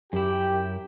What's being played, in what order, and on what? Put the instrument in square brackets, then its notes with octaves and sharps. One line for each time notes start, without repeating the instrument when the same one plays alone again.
[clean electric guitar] F#2 E4 [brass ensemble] G4 G5